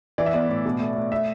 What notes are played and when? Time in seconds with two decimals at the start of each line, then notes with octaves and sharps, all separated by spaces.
0.18 E3 D5
0.26 E5
0.33 B3 D5
0.49 A2
0.66 B2
0.80 A3
0.96 A3
1.11 A3 E5